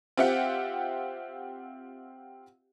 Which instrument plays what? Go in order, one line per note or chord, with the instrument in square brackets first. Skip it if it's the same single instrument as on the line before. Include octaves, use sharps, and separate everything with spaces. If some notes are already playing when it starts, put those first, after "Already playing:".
[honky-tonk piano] C4 F4 G4 E5 F#5 G5